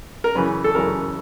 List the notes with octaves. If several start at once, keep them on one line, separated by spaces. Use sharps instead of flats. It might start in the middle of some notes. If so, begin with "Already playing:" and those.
A#4
F#2 C#3 E3 B4
A4
F#2 C#3 E3 A#4